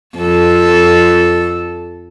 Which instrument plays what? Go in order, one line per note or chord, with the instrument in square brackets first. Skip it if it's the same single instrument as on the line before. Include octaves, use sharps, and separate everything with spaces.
[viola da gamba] F2 A4